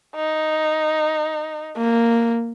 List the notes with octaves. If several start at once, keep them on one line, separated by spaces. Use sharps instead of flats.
D#4
A#3